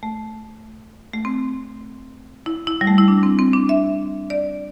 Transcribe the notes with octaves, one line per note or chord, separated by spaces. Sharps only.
A3
A3
C4
E4
E4
G3
A3
E4
D4
C4
C4
D4
E5
D5